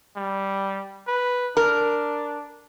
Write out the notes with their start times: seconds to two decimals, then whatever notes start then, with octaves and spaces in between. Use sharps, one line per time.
0.16 G3
1.08 B4
1.57 D4 A#4